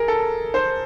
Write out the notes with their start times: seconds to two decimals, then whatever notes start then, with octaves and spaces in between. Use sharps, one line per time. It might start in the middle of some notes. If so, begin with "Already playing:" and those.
Already playing: G#4 A#4
0.08 A4
0.54 C5